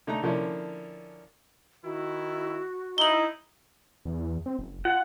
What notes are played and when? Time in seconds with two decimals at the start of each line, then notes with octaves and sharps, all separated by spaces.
0.07 D3 A3 D#4 E5 A#5
0.23 D3 F3 A#3 C#4 D4 E4
1.84 D#3 E4 F#4
2.98 D#4 E4 F#7 G7
4.05 E2
4.46 C4
4.59 F#1
4.85 F4 F#5